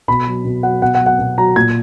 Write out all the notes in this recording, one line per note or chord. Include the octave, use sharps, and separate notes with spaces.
B2 B5
F#3
B2
F#3 F#5
B2 F#5
F#5
F#3
F#5
B2
F#3 A#5
A#2 G#6